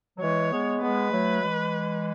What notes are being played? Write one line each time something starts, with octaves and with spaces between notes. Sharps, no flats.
F#3
E3 G#3 C#5
G#3 B3
G#3 B3 B4
F#3 A3
E3 G#3